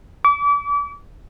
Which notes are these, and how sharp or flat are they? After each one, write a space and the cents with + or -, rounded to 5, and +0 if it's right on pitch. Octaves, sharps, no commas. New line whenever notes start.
D6 -35